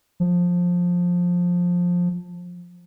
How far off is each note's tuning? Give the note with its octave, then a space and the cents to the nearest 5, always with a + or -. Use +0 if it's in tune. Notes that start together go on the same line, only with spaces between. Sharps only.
F3 +15